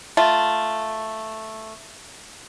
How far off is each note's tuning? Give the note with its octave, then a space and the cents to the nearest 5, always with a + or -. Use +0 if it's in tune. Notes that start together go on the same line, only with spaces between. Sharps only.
A3 +0 F4 +0